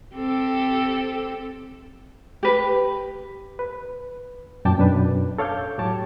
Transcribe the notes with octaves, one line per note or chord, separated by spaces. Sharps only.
C4 G4 A4
G4 B4
B4
F#2 A#2 G5 A5 D6
F#2 B2 D4 B4
A4 C#5 F5 D6 G6
A2 F#3 G4 C#5 A5 D6